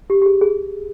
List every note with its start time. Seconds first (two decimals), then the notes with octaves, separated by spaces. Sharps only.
0.10 G4
0.22 G4
0.26 G#4
0.41 G#4